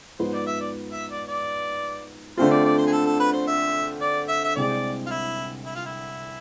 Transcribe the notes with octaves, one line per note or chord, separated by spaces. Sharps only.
G#2 F3 B3 C5
D5
E5
D5
E5
D5
D5
D3 A3 C4 F4 C5
D5
D5
C5
G#4
A4
A4
B4
C5
E5
D5
E5
E5
C2 C3 G#3 C4 G#4 D5
F4
E4
E4
F4
E4